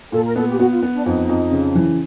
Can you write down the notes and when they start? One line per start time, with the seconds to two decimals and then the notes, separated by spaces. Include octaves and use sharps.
0.12 A#2 A4
0.24 A#4
0.36 B3 A4
0.48 G4
0.59 B3 F#4
0.71 F4
0.82 B3
0.94 D4
1.05 F2 D#4
1.29 F2
1.51 C#3
1.75 E3